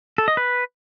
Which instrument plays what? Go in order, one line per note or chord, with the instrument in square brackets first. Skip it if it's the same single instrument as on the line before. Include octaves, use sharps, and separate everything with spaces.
[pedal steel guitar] A4
D#5
B4